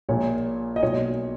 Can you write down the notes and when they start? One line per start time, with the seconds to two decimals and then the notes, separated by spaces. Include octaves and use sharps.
0.09 A#1 A#2 C#5
0.76 D#5
0.82 B1 A#2 C#5